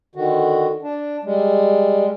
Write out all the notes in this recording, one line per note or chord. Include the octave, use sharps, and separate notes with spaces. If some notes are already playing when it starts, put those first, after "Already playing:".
D3 D#3 F#4
D4
G3 G#3